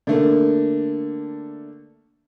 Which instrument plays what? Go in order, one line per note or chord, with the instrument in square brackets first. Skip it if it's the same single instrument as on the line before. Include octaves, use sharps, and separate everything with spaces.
[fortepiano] D3 A3 A#3